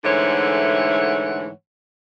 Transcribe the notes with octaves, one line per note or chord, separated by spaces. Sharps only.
G#2 D3 E3 A3 C#5 F#5